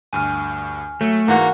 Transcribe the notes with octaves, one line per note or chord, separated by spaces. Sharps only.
D2 G2 G#5 F6
F#3 A3
G#2 E3 A#3 F#4 F#5